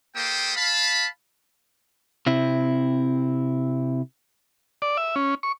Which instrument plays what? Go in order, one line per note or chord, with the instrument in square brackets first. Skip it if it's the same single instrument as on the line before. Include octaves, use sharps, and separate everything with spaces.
[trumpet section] A#3 G4 A4 C5 G5 D#6
F5 A5 B5
[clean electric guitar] C3 C4 E4
[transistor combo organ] D5
E5
C#4
C#6